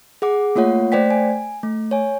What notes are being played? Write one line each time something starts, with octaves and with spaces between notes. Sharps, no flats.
G#4 F#5 D6
A3 A#3 F4 C#5 F#5
A3 C5 D5 G5 B6
G#5
A3
C#5 G#5